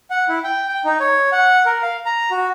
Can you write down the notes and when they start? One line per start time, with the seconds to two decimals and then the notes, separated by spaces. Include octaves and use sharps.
0.11 F#5
0.29 E4
0.44 G5
0.68 G5
0.85 D#4
1.00 C#5
1.32 F#5
1.66 A#4
1.82 F5
2.06 A#5
2.31 F#4